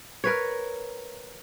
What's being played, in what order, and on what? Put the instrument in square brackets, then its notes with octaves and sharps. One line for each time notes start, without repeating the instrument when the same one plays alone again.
[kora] A#4 B4 C#5